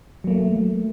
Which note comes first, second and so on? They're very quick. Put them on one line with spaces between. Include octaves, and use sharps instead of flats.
F#3 A#3 A3